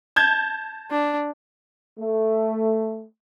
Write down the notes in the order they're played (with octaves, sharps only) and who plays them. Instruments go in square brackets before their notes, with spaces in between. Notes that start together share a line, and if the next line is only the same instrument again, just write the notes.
[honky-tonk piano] A5 G6 G#6
[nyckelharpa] D4
[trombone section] A3